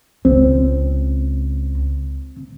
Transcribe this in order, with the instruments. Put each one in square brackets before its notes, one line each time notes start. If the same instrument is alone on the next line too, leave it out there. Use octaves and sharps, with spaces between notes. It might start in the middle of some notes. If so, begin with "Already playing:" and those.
[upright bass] C#2 [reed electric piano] C4